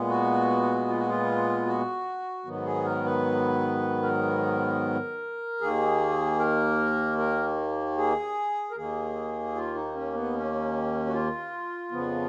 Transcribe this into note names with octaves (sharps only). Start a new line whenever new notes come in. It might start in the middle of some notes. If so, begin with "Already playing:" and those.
Already playing: A#2 G#3 B3
F#4
F4
F#4
F4
F#4
G#2 D#3 F#3 B3
G#4
A#4
B4
A#4
D#2 D#3 A#3 G#4
A#4
A#4
G#4
A#4
D#2 D#3 A#3 G#4
F4
D#4
C#4
B3
C#4
F#4
F4
F2 C#3 F3 B3